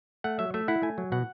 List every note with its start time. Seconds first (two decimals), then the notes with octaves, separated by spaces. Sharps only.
0.24 A3 F#5
0.39 F#3 E5
0.54 A3 E5
0.68 E4 F#5
0.82 A3 G#5
0.98 F#3
1.12 B2 F#5